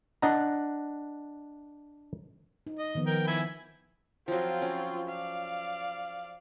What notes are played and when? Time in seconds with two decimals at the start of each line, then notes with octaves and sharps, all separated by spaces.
0.22 D4 D#5 F#5 A#5
2.67 D#4
2.79 D#5
2.95 D#3 F3 B3
3.07 A#4 G5
3.27 E4 G#5 B5
4.28 F3 F#3 C4 F4
4.62 C#4
5.09 D5 F5